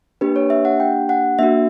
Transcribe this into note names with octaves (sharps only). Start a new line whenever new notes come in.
A#3 D4 G4 B4
C#5
E5
F#5
G5
F#5
A#3 D4 F#4 E5